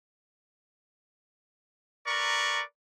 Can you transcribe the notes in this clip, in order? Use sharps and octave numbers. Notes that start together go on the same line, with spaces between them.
A#4 B4 D5 A#5 C#6